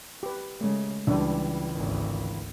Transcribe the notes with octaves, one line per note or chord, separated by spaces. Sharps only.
G4 B4
C#3 G#3 A3
C#2 C#3 E3 G3 D4
G#1 D2